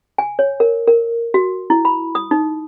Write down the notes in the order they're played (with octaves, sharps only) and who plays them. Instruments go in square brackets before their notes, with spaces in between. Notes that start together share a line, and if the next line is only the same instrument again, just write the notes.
[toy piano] G#5
C#5
A#4
A#4
F#4
E4
B5
D#6
D#4